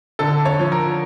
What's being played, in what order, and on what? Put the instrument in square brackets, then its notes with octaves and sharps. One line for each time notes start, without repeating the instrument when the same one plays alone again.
[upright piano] D3 A4
C#5
F3
A#4